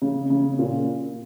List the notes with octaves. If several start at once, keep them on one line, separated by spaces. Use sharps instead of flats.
C#3
C#3
A#2